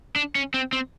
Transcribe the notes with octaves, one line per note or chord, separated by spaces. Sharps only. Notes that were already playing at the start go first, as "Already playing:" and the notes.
D4
C#4
C4
C4